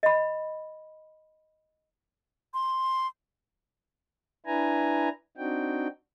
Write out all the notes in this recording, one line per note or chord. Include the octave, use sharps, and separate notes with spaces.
D#5 B5
C6
D4 E4 B4 G#5 A#5
C4 D4 D#4 F#4 G5